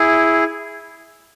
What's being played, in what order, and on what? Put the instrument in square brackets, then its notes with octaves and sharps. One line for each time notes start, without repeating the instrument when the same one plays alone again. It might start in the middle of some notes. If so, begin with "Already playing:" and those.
Already playing: [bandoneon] E4 G#4